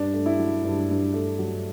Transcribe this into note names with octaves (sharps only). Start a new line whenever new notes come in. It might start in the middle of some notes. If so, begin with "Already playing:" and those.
Already playing: G2 D4
A3
E4
F#3
G2
G2
A3
F#3